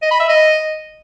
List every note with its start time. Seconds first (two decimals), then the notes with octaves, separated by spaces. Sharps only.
0.02 D#5
0.11 B5
0.20 E5
0.28 D#5